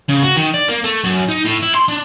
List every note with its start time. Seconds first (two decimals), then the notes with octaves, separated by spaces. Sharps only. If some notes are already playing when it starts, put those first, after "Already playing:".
0.09 C#3
0.23 F#4
0.36 D#3
0.54 D5
0.68 A#3
0.84 A3
1.04 F#2
1.28 D#4
1.45 A2
1.62 E4
1.75 C6
1.88 D4